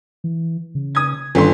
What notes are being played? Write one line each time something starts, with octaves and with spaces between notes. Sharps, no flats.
E3
C#3
D#6 G#6
G1 D3 D#3 C6